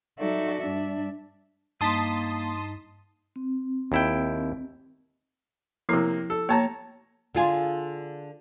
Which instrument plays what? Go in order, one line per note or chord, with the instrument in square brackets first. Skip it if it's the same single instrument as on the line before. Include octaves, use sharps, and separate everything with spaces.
[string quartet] F#3 D#4 F#4 A4 D5 E5
G2 D4 E5
[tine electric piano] G2 D#4 B6 [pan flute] A#3 [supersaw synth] A5 C6 D#6
[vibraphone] C4
[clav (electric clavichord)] D#2 E4 G5
[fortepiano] C3 A#3 [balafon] F3 E4
[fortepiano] A4
[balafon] A#3 [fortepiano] C#5 A5 A#5
[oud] D3 F4 G#4